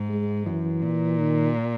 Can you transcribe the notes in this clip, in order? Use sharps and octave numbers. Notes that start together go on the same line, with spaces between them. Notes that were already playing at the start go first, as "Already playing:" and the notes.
Already playing: G#2
G#3
F#2 E3
A#2
D#3